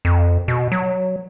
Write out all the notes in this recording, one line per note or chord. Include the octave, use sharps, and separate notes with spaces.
F2
B2
F#3